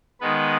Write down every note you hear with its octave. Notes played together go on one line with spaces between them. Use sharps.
D#3 G#3 B3 B4